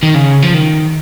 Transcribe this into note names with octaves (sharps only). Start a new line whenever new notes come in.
D#3
C#3
F3
D#3